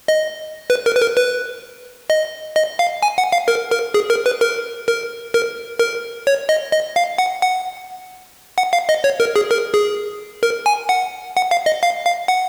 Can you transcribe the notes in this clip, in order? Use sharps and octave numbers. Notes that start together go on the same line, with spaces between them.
D#5
B4
A#4
B4
A#4
B4
D#5
D#5
F5
G#5
F#5
F5
A#4
A#4
G#4
A#4
B4
A#4
A#4
A#4
A#4
C#5
D#5
D#5
F5
F#5
F#5
F#5
F5
D#5
C#5
A#4
G#4
A#4
G#4
A#4
G#5
F#5
F#5
F5
D#5
F5
F5
F#5